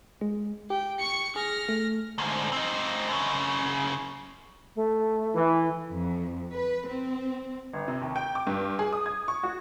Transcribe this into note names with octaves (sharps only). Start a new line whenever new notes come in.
G#3
G4 G5
C#6 C#7
G#4 F6 A#6
A3
D2 G#2
C4 D#4
F#2 C#3
A3
E3
F2
B4
C4
G1
C3
D#2
G5
D6
G2
G#4
D#6
G#6
C#6
F#4